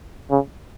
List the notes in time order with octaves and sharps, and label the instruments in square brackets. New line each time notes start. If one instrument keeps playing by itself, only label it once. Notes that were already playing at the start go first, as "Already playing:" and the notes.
[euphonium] C#3